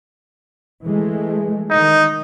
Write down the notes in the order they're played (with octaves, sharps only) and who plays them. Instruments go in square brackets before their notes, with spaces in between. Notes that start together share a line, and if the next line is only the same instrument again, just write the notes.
[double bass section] E3 G#3 A3
[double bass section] D#3 [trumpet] D#4